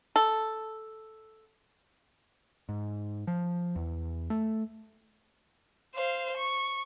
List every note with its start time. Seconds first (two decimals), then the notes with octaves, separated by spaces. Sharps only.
0.16 A4
2.69 G#2
3.27 F3
3.76 E2
4.30 A3
5.94 C5 F5
6.37 C#6